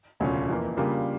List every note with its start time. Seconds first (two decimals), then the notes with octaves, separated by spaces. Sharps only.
0.20 E1 D2 C#3 F3 C#4
0.48 F2 E3 A#3
0.77 C#3 G3 A#3 D4 F4